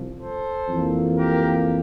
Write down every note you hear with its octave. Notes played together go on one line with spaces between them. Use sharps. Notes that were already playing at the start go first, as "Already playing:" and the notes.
Already playing: C2 C3 F3
A4 C5
F2 E3 A#3
G4 A#4